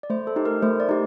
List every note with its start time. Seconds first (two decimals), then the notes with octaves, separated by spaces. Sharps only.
0.03 D5
0.10 A3 C5
0.27 A4
0.36 D#4 G4
0.45 A#4
0.62 A3 C5
0.80 D5
0.89 D#4 G4